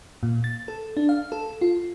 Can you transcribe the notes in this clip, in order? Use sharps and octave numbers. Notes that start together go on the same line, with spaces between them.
A#2
A6
A4
D4
F5
A4
F4